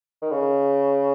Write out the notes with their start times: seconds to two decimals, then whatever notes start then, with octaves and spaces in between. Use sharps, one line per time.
0.22 D#3
0.31 C#3